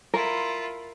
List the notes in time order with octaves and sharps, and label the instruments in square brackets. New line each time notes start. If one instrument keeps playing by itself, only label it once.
[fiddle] E4 F4 [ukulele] A#4